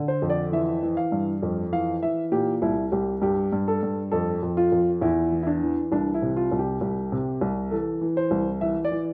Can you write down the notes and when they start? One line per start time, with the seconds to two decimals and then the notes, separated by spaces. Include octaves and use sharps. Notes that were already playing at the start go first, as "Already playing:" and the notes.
Already playing: D3
0.08 C5
0.22 F2
0.30 D5
0.52 E3 E5
0.83 E3
0.97 F5
1.12 G2
1.43 F2
1.72 E3 F5
2.02 E3 E5
2.32 A#2 G4
2.62 C2 E4
2.92 C2 G4
3.22 G2 G4
3.52 G2
3.68 A4
3.83 G2
4.12 F2 A4
4.42 F2
4.57 F4
4.72 F2
5.01 E2 E4
5.32 E3
5.43 E4
5.47 D4
5.62 E3
5.92 C2 D4
6.14 E4
6.22 C3
6.36 F4
6.52 C2
6.59 G4
6.81 C2
7.12 C3
7.41 C2
7.71 E3 A4
8.01 E3
8.17 C5
8.31 C2
8.61 E3 E5
8.85 D5
8.92 E3